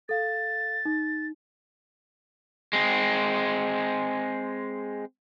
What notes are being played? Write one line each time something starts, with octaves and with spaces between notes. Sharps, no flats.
A4 F5 A6
D#4
G#3 C4